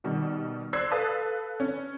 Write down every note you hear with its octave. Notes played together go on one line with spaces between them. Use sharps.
B2 D#3 G3
C5 D5 E6 F#6 G#6 C7
A4 B4 F5 D#6 A6
C#4